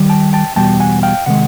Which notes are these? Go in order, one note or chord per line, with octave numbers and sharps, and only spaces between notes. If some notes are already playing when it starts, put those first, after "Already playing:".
Already playing: D#3 G3
G5 A5
G5 A5
E2 B2 G3 G5 A5
F#5 G#5
F5 G5
C3 D#3 G#3 F#5